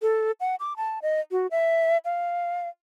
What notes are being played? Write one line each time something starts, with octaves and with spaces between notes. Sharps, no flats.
A4
F#5
D6
A5
D#5
F#4
E5
F5